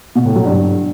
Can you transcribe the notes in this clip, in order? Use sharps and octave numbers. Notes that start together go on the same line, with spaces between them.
B2
A2
F#3
G2